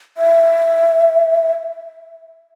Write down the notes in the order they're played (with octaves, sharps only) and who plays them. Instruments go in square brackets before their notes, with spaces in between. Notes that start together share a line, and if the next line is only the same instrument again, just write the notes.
[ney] E5